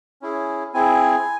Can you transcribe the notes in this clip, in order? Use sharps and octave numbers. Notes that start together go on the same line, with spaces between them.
C#4 E4 G#4
C4 E4 G#4 G#5